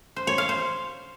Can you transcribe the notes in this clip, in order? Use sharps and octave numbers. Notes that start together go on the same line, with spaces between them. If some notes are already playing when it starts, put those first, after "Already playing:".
C5
C#5
F5
C5